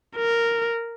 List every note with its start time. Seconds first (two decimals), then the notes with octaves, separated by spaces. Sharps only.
0.17 A#4